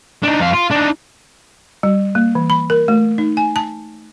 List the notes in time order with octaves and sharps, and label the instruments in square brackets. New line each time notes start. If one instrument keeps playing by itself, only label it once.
[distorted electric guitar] D4 D#4
F2 F5
F4
D4 D#4
[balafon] G3
A#3
E3
B5
A#4
A3
D#4
G#5
A5